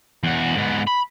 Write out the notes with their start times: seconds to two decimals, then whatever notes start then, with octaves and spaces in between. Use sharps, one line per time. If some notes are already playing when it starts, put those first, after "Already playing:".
0.23 E2 F#4
0.56 G#2 B3
0.87 B5